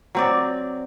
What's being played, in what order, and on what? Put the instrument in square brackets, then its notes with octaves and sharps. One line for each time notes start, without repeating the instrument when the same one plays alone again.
[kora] F#3 C4 D5